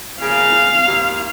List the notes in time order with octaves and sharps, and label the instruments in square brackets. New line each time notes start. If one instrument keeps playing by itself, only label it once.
[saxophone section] C#3 A#3 [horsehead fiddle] F5
[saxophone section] D#2